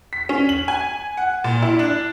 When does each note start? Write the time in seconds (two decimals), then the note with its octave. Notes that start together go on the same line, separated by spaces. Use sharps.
0.13 B6
0.29 C#4
0.49 F#7
0.68 G#5
1.17 F#5
1.44 A#2
1.62 E4
1.79 D4